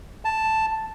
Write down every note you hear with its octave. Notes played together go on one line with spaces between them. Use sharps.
A5